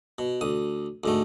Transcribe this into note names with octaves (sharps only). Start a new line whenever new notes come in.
B2
D2 D#6
D2 G#2 A3